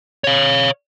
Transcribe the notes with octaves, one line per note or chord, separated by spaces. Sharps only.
C#5 F5